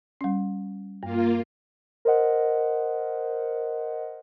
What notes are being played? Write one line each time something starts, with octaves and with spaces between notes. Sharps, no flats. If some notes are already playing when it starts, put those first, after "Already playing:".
G3 C#4
G2 A#3 F4
A#4 C5 D#5 F#5